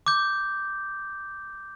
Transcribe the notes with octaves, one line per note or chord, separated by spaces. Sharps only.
D6 G6